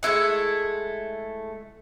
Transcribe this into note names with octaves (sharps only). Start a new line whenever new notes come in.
G#3 A3 E4 F#5